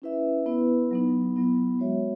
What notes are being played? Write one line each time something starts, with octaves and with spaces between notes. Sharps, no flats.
C#4 E4 B4 E5
B3 E4 B4
F#3 B3 D#4
F#3 B3 E4
G#3 B3 F#4 C#5 E5